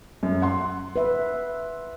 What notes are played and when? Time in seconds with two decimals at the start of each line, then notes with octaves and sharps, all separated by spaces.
0.23 F#2
0.42 F#5 C6
0.96 B4 E5